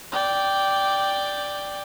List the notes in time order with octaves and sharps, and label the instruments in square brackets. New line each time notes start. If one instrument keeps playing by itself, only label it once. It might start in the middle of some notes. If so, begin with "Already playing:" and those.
[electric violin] D5 G5